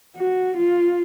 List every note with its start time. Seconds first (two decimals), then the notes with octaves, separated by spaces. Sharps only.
0.16 F#4
0.56 F4